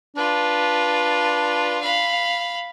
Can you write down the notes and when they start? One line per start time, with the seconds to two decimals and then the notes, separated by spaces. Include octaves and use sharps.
0.17 D4 F4 B4
1.81 F5 B5